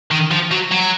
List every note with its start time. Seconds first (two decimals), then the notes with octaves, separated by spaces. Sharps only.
0.11 D#3
0.31 F3
0.51 F#3
0.72 F#3